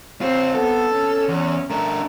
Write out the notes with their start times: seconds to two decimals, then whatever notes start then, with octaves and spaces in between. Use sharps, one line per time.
0.21 C4 F4 C#5
0.55 B3 A4
0.92 C#4
1.28 E2
1.70 A3 D4 A#4